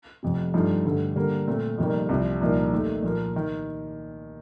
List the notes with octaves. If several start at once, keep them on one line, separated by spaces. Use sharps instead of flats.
F1 F2 C3
G2 F3 A3 D#4
G2 D3 A3
D3 G3 A#3
A#2 A3 C4
F2 C3 D#3 G3 A#3
C2 C3 F3
C2 A#2 F3 A#3 D#4
D#2 D#3 A3
A#2 F3 A#3
D#3